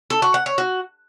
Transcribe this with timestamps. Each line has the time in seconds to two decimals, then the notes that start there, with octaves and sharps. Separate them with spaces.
0.10 A4
0.22 F#4
0.34 F#5
0.46 C#5
0.58 F#4